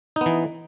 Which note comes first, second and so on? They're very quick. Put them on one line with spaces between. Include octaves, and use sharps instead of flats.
D#4 B3 E3